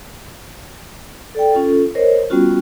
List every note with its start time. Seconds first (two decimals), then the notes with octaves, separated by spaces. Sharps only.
1.35 A4 D5 G5
1.52 C#4 F4 A4
1.95 A#4 C5 C#5 D#5
2.30 G3 B3 C#4 F4 F#4